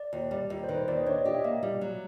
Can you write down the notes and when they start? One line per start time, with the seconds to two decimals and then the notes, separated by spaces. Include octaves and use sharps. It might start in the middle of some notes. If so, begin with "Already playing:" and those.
Already playing: D5
0.13 D#2
0.31 G3
0.50 D#2
0.64 C5
0.69 D#3 B4
0.78 C5
0.88 D#2 D5
0.97 D#5
1.06 D4 C#5
1.16 D5
1.25 G4 D#5
1.34 E5
1.44 A#3 F5
1.63 G3
1.81 F#3